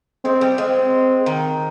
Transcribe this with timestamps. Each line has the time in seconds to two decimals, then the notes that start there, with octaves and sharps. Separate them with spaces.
0.24 G#3 C4
0.41 G3
0.58 G#3 C4
1.26 D#3